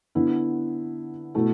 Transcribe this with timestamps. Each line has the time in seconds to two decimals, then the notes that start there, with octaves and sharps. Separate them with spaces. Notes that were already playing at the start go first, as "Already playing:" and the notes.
0.15 D3 B3 E4
1.35 B2 A3 E4